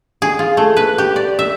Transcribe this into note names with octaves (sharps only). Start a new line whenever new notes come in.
G#4
F4
A3
B4
G4
D5
E5